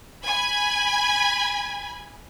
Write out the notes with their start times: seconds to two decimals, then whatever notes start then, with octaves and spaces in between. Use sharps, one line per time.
0.24 G#5 B5